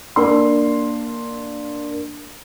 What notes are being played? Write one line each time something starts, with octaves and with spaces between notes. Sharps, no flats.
A#3 D4 C6